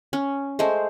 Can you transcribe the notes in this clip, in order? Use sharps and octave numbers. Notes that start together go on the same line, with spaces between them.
C#4
G#3 A3 C5